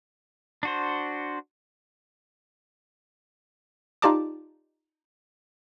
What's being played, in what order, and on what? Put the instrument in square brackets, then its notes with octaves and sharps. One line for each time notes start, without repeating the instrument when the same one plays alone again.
[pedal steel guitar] D4 F#4 C5
[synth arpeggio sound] D#4 F4 G4 D5 A5 D6